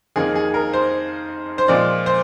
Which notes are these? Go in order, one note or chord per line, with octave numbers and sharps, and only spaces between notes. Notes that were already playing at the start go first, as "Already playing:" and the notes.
F2 D#3 A#3 G#4
G#4
A#4
C5
C5
A#2 F3 G#3 D5
C5